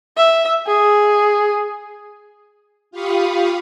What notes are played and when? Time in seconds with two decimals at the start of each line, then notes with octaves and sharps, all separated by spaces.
0.17 E5
0.67 G#4
2.91 F4 G4 F5 B5 C#6 D#6